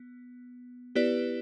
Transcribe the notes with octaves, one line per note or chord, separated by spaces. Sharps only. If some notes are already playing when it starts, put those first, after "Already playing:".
Already playing: B3
B3 E4 G4 B4 D5